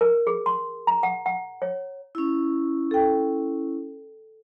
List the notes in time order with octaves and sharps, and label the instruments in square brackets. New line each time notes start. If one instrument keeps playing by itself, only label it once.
[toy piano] A#4
G#4
C6
A#5
F#5
F#5
C#5
[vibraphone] C#4 E4
[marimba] A4 G5